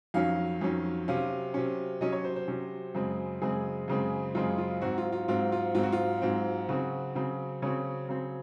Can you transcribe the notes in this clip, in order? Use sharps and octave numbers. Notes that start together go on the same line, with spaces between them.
F2 D#3 F#3 C#4 F5
F2 D#3 F#3 C#4
C3 F#3 C#4 F5
C3 F#3 C#4
C3 F#3 C#4 D#5
C#5
C5
C5
C3 F#3 C#4
F#2 C#3 G#3 C4
F#2 C#3 G#3 C4 G#4
F#2 C#3 G#3 C4
F#2 C#3 G#3 C4 F4
F4
G#2 F#3 C4 F#4
F4
F4
G#2 F#3 C4 F4
F4
G#2 F#3 C4 F4
F#4
F4
G#2 F#3 C4
C#3 F#3 C4 F#4
C#3 F#3 C4
C#3 F#3 C4 C#5
C#3 F#3 C4